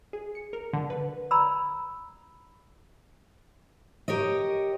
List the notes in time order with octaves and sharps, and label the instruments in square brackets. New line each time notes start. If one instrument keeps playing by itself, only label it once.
[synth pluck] G#4
C#7
A#4
D3
B4
[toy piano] D5 A#5 B5 E6
[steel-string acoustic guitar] G4 A#4 C#5 D#5